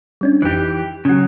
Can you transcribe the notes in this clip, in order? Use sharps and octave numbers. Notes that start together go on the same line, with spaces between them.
G3 C#4 D4
G1 F2 E3 D#4 G4
C#3 F#3 C#4 F#4